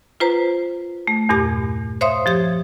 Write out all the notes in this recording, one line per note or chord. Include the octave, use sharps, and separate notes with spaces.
F4 B4 C5 A#5
A3
E2 G2 A#2 G4 G#6
C5 C#5 E5 F5 C6 D#6
F3 G4 G#6